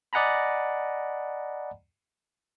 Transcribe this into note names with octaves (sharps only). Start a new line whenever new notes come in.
D5 D#5 F#5 G#5 A#5 B5